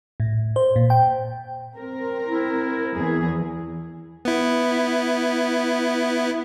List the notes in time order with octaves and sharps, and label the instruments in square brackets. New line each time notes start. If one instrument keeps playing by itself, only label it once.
[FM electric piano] A2
C5
A#2
G5
[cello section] C4 A#4
[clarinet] E4
[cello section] E2 E3 G#4
[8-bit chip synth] B3 E4